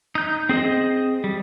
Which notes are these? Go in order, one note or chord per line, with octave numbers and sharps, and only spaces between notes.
D#4 G6
C4 G#4 C5 D#5
G3